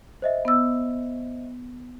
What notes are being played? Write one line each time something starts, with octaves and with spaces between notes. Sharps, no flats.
C5 D#5 E5
B3 E6